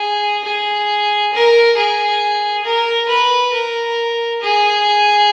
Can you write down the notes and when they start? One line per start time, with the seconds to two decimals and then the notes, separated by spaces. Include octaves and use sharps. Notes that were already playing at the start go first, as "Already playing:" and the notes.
Already playing: G#4
0.44 G#4
1.33 A#4
1.77 G#4
2.64 A#4
3.09 B4
3.53 A#4
4.41 G#4